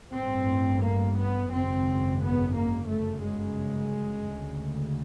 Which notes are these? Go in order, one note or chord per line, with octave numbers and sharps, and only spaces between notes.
A1 G2 C4
A#3
B3
G#1 F#2 C#3 C4
B3
A#3
G1 F#2 C#3 A3
G#3
D2 C#3